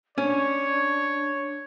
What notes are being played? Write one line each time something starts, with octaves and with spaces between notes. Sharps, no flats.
C#4 D4 C#5